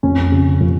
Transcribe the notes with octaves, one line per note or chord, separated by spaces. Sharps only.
F2 C#4
C#3
F3